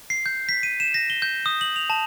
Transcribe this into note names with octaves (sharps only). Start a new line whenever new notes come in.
C7
G6
B6
D#7
E7
A#6
G7
G6
D#6
F#7
F7
A5